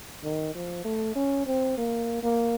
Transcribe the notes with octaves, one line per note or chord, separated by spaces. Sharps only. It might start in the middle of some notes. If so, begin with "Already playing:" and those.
D#3
F3
A3
C#4
C4
A#3
A#3